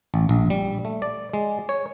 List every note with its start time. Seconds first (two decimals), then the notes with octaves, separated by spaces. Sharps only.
0.14 A1
0.29 A#1
0.50 G3
0.85 A3
1.02 D5
1.33 G#3
1.69 C#5